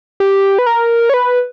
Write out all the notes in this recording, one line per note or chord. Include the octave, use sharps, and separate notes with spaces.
G4
B4
A#4
C#5
B4